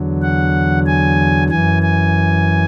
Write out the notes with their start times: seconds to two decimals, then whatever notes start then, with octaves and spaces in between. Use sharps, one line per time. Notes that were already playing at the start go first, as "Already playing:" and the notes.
Already playing: E2 D3 F#3
0.22 F#5
0.86 G#5
1.50 F#2 E3 G#5
1.82 G#5